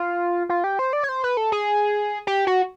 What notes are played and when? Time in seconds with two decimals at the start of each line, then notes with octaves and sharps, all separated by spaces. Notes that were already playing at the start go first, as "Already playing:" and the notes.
Already playing: F4
0.49 F4
0.64 G4
0.79 C5
0.93 D5
1.03 C#5
1.09 C5
1.24 B4
1.37 A4
1.52 G#4
2.27 G4
2.47 F#4